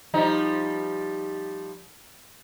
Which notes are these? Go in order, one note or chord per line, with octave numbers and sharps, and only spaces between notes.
F3 G3 D#4